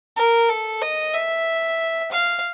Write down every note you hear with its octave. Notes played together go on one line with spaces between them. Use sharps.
A#4
A4
D#5
E5
F5